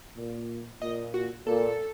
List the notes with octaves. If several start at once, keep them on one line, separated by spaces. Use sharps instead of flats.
A#2
A#2 D#5
F#4
A#2 A4